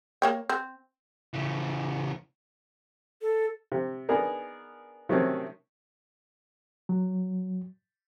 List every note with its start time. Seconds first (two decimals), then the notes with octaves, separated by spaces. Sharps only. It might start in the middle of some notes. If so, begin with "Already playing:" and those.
0.22 A#3 C#5 G5
0.49 C4
1.34 C#3 E3
3.22 A4
3.72 C3
4.09 B3 D4 D#4 G#4 A#4
5.09 C3 D#3 F#3 A3 C4 C#4
6.89 F#3